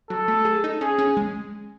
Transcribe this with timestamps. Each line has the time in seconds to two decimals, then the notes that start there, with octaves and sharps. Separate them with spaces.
0.10 F#3 A4
0.28 A3
0.45 G#4
0.64 D#4
0.81 C#4 G#4
0.99 C#4
1.17 G#3